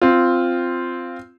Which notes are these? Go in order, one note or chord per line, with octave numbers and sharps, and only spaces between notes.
C4 F4